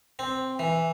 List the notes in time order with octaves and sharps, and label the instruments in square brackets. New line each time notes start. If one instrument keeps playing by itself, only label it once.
[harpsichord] C4
E3